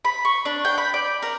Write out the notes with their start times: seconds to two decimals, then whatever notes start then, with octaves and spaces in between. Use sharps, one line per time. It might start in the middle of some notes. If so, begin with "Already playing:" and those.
0.05 B5
0.25 C#6
0.45 D4
0.65 G5
0.78 B5
0.94 D5
1.22 A#4